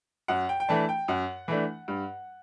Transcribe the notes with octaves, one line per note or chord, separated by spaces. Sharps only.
F#2 F#5
G5
G5
E3 A3 D4 A5
G5
F#2 F#5
E3 A3 D4
G2